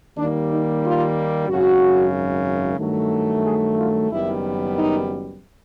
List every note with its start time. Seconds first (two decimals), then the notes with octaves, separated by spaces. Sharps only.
0.17 D#2 D#3 G3 A#3 D4
0.50 D#4
0.83 F4
1.48 G#1 F#2 C#3 F#4
2.80 G2 D#3 F#3 A3
3.45 G#4
3.78 F4
4.10 F#1 F#2 D#3 G3 B3 E4
4.77 D#4